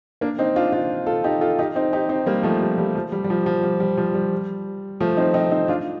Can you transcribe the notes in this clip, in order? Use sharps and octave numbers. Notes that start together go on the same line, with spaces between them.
A#3 D4
C4 D#4
D4 F4
D4 F4
F4 A4
D#4 G4
F4 A4
D#4 G4
C4 D#4
D#4 G4
C4 D#4
G3 A#3
F3 A3
G3
G3
F3
G3
G3
F3
F3
G3
G3
F3
G3
F3 A3
C4 D#4
C4 D#4
C4 D#4
D4 F4